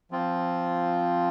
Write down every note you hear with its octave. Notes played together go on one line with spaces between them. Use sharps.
F3 C4 F4